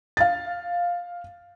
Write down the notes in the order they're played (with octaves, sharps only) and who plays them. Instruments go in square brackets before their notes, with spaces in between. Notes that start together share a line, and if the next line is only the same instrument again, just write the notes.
[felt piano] F5 A6